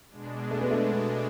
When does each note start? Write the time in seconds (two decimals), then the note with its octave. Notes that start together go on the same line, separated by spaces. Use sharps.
0.11 B2 G#3 D4
0.51 A3
0.61 B3
0.71 A3
0.91 B3